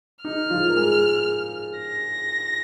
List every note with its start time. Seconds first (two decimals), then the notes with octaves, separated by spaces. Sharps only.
0.25 D#4 F6
0.50 F3 F4
0.69 A#4
0.76 G#3 G#4
1.78 A#6